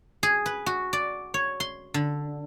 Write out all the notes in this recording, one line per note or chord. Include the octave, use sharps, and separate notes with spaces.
G#4
B4
F#4
D5
C#5
C6
D3